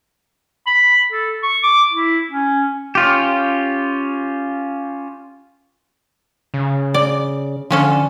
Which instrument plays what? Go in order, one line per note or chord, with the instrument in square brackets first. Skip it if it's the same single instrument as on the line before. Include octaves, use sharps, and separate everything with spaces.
[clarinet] B5
A4
C#6
D6
E4
C#4
[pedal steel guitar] C#4 F4 G4
[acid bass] C#3
[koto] D5
[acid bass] D3 [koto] F3 C#4 A4